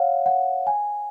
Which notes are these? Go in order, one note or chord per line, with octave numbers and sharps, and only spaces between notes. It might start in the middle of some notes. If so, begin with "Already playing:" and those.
Already playing: C#5 F5 F#5
F#5
G#5